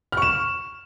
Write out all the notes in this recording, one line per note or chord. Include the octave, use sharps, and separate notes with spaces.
C#6 F6 E7